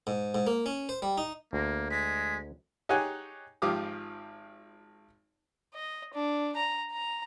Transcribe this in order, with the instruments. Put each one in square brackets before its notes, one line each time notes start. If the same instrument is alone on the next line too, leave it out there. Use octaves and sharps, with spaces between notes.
[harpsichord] G#2
G#2
A#3
C#4
C5
G3
D#4
[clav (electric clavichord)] D2 [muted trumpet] A#3
[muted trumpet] G#3 [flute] B6
[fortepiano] D#4 G4 G#4 C#5 F#5 G#5
G#1 F3 F4 G4 D6 D#6
[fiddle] D#5
D4
A#5
A#5